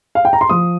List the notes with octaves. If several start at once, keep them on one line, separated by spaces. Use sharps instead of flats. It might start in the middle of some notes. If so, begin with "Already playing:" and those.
F5
G5
A#5
C6
F3 D#6